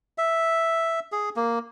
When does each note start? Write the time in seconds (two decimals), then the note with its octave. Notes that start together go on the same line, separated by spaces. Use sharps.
0.18 E5
1.12 G#4
1.36 A#3